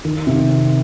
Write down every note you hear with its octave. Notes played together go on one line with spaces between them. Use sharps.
D#3
C3